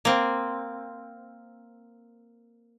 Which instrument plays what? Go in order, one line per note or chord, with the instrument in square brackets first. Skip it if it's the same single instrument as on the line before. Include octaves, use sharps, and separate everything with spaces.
[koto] A#3 C4